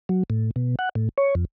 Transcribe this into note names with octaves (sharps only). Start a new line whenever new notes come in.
F#3
A2
B2
F#5
A2
C#5
F2